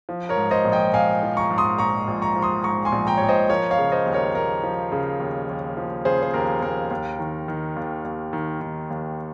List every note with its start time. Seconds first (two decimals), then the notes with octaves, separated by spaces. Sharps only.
0.09 F3
0.29 A#4 C#5
0.37 G#2
0.51 C5 D#5
0.65 A#1
0.72 D#5 G5
0.93 A#1 F5 G#5
1.23 F3
1.37 A#5 C#6
1.51 G#2
1.58 C6 D#6
1.78 A#1 A#5 C#6
2.08 A#1
2.22 A#5 C#6
2.36 F3
2.42 C6 D#6
2.64 G#2 A#5 C#6
2.85 G#5 C6
2.92 A#1
3.07 G5 A#5
3.17 A#1 C#5
3.29 C5 D#5
3.50 F3 A#4 C#5
3.71 C#5 F5
3.78 C#3
3.92 C5 D#5
4.06 D#2
4.13 A#4 C#5
4.34 D#2 A#4
4.63 F3
4.92 C#3
5.20 D#2
5.49 D#2
5.77 F3
6.05 C#3 G#4 C5
6.23 C5
6.34 D#2 A#4
6.62 D#2 A#4
6.91 D#2
7.19 D#3
7.48 D#3
7.76 D#2
8.05 D#2
8.33 D#3
8.61 D#3
8.90 D#2